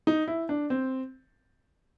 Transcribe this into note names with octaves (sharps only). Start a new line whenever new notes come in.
D#4
E4
D4
C4